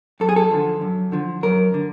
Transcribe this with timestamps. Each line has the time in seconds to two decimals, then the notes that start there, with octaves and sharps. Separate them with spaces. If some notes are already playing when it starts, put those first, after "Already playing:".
0.20 F#2 A4
0.29 G#4
0.36 A4
0.51 D3 F3
0.81 F#2
1.12 D3 F3
1.43 F#2 A#4
1.74 D3